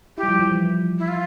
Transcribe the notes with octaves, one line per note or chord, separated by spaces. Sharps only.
E4 G4
G3
F3
F3
E3
E4
F4